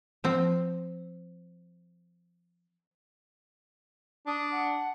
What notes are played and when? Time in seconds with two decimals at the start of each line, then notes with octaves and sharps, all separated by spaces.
0.24 F3 C4
4.27 D4 D#6
4.51 F#5